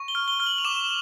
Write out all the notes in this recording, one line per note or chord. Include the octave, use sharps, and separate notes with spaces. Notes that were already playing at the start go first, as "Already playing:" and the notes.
Already playing: C#6
G7
F6
G7
F6 G7
F#7
F7
D6 E7